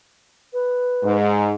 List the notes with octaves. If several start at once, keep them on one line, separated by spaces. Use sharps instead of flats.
B4
G#2